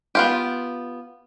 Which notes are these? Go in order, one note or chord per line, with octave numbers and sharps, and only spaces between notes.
B3 F4 G4